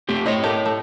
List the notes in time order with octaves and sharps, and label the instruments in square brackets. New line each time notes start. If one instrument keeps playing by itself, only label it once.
[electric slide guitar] A3 C4 G4
[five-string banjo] C4 D#5 [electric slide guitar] E4 C#5
[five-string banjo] A3 A#3 G4
A3